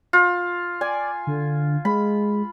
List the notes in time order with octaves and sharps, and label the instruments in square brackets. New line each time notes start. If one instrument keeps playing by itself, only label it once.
[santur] F4
[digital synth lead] D5 [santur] G#5
[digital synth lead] D3
[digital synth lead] G#3 [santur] B5